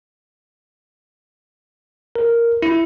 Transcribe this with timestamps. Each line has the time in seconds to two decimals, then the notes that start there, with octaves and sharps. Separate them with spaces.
2.16 A#4
2.62 E4